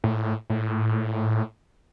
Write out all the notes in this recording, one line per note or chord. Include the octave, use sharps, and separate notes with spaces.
A2
A2